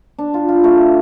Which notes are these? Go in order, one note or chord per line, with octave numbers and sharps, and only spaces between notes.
D4
F4
F4
A3